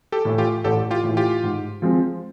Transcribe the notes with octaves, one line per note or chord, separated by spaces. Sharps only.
G4 A4
A2 E3
F4 G4
A1 G4 A4
F4 G4
A2
E3
F4 G4
G#2
F3 G#3 C4